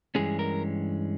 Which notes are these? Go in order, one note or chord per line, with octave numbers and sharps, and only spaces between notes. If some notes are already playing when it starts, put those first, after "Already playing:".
G2 E3 G#3 C#4 G#4
A#4